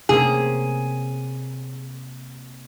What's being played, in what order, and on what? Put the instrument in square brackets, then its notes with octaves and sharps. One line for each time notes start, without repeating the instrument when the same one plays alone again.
[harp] C3 A#3 [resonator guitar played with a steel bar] C#4 G#4